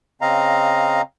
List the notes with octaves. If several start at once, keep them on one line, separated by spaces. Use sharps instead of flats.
C#3 C4 D#5 F5 A#5